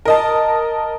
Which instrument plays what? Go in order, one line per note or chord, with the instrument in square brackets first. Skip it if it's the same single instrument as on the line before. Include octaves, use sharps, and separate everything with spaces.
[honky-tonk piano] A#4 D#5 A5